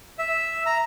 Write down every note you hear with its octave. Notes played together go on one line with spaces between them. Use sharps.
E5
A#5